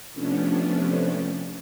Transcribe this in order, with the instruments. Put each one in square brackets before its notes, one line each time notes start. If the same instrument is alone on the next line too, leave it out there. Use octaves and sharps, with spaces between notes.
[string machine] C3 F3 A3 B3 C#4 D4